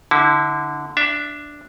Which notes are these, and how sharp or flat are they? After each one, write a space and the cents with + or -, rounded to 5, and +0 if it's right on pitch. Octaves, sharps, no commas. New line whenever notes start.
D3 +0 E4 -35
D4 +0 E5 +15